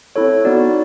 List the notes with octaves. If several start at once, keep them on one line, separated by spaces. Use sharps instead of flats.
C4 E4 A4 C#5
B3 D#4 F#4 D5